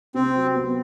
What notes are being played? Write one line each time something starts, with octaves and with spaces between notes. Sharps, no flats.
C3 C4
F#3
B3